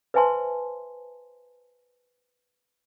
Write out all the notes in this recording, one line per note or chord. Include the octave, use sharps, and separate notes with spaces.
B4 C5 E5 G#5 A5 C6